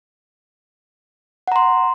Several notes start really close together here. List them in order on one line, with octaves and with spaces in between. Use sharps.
F#5 A#5 C6